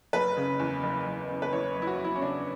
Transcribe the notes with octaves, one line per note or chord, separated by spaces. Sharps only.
F#1 B4
C#3
E2
F#1
F#1
C#3
B4
E2 C#5
F#1
E4
F#4
F#1
E4
C#4
C#3 D4